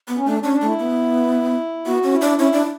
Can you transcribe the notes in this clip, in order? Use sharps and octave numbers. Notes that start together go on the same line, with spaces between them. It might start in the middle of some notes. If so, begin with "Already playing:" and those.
B3
C#4
A3 D4
D4
C#4
D4
A3 E4
B3
B3 F#4
C#4
E4
D4
C#4 E4
D4